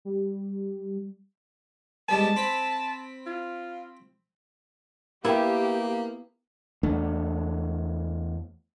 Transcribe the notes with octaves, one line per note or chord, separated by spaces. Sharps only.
G3
G#2 G3 B3 A5
C4 B5
F4
A#3 B3 E4 G4 A#4 G5
E2 A3 D4